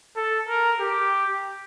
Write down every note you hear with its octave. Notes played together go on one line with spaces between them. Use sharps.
A4
A#4
G4